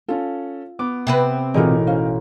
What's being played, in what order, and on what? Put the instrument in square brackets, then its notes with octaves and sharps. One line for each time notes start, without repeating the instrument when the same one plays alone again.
[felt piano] C#4 A4 [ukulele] F4
[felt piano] B3 [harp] D6
[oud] C3 C4 B4
[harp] A1 B2 [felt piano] D#4 A#4 [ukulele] F4 G#4 D5
[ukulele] C#4 C5 F5